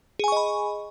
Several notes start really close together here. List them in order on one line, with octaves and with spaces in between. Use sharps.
G#4 G#5 C#6 D#5 B5